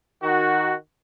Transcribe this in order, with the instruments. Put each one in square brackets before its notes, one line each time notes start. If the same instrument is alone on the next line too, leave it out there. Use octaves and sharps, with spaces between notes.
[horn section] D#3 F#4